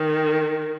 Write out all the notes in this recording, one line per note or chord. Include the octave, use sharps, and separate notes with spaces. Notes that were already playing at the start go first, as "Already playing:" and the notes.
Already playing: D#3